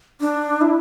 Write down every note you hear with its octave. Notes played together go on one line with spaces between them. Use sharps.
D4
E4